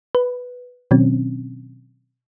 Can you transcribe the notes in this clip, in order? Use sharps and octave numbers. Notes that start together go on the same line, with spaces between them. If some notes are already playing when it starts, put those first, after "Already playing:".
B4
B2 D#3 F#3 C4 C#4